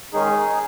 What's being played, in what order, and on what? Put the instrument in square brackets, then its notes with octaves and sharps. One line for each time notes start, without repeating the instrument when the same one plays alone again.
[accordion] D#3 G#3 C#4 D#4 G#4